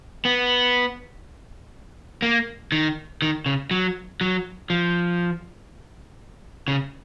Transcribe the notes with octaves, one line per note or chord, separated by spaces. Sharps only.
B3
A#3
D#3
D#3
C#3
F#3
F#3
F3
C#3